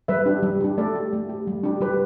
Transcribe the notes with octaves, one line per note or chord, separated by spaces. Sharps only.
G3 B4 E5
D4 G4
G3
D4 G4
A3 A4 D5
G4
A3
G4
G3
D4 G4
G3 G4 B4